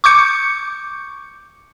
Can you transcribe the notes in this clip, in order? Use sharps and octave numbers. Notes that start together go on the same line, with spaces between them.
C#6 D6 G6 C#7